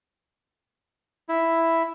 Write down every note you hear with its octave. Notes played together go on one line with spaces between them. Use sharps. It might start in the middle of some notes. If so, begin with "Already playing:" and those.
E4